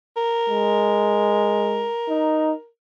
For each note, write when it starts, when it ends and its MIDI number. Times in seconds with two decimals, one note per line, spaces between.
0.17 2.67 70
0.49 1.90 56
2.08 2.53 63